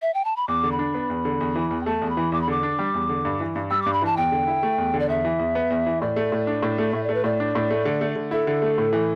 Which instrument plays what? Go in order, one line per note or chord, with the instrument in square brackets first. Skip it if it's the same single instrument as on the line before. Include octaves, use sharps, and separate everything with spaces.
[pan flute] E5
G5
A5
B5
[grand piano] E2 [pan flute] D6
[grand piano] D3
[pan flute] B5
[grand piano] D4
B3
E2
D3
E2
E3
E2
[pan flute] G5
[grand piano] A3 [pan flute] A5
[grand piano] E2
[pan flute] B5
[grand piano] E3
[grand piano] E2 [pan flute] D6
[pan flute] B5
[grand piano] D3 [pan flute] D6
[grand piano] D4
G3
E2
D3
G2
E3
G2
[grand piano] G3 [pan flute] E6
[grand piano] G2 [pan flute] D6
[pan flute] B5
[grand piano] E3 [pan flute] A5
[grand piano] E2 [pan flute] G5
[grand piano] D3
E4
A3
E2
D3
[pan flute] D5
[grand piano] E2 [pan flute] E5
[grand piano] E3
E2
B3
E2
E3
[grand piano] A2 [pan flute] D5
[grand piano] A3
A2
D4
A2
A3
[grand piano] A2 [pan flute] E5
[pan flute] D5
[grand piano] A3
[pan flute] B4
[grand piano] A2 [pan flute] D5
[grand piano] D4
A2
A3
D3
A3
D3
[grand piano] E4 [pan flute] A4
[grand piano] D3
A3
A2
E3